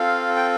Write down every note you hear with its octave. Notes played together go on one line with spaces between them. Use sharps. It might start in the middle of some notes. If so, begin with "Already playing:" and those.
Already playing: C4 F4 A4 F5
G5